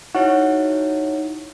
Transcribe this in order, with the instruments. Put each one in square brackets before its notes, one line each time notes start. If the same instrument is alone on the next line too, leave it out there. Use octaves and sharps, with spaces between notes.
[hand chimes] D#4 E4 C#5 [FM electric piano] F#4